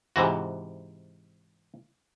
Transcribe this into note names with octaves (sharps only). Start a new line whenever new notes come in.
G#2 C3 E3 F#4